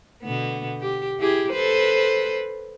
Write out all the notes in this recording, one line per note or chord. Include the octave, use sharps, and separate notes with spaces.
B2 D3 B3
G4
E4 G4 G#4
A4 B4 C5